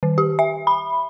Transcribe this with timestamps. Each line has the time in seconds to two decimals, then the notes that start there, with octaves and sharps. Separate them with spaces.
0.03 D#3
0.18 G4
0.39 E5
0.67 B5